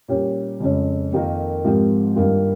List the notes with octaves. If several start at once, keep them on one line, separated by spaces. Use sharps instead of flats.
A#2 G3 C#4 G4
F2 C#3 G#3 C#4
F2 D#3 A#3 F4 A#4
G#2 F3 C4 G4 A#4
G2 D#3 A#3 F4